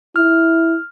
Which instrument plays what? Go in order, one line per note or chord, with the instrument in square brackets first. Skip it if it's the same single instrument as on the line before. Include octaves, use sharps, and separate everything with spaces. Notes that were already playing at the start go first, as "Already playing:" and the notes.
[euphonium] E4 [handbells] F6